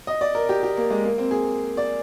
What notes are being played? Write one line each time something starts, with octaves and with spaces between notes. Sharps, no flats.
D#5
D5
A#4
G4
G4
A#3
G#3
A#3
C4
G#4
D5